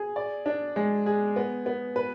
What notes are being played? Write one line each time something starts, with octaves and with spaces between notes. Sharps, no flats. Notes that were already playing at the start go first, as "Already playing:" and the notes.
Already playing: G#4
D5
D4
G#3
G#4
B3
B3
B4